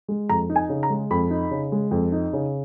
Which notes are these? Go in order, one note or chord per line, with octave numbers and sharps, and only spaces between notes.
G#3
F2 A#5
D#4
G#5
C#3
A#5
G#3
F2 B5
D#4
C#3
G#3
F2
D#4
C#3